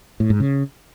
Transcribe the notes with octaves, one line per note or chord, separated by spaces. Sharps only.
A2
G#2
C#3